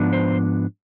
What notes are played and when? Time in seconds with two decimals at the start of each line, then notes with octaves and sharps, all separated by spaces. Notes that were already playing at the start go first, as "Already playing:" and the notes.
Already playing: G#2 F3 B3 D4
0.13 C5